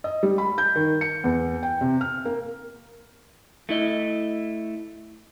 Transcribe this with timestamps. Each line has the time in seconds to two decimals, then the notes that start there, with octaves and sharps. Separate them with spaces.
0.04 D#5
0.23 G3
0.38 B5
0.58 G6
0.76 D#3
1.01 C#7
1.24 E2
1.63 G5
1.81 C3
2.01 F6
2.25 A#3
3.69 A3 E4 D#5